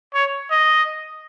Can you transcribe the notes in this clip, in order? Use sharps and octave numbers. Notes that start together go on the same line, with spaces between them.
C#5
D#5